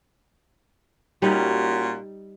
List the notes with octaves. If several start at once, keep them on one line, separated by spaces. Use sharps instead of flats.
A#2 G3 C#4 D#4 F#4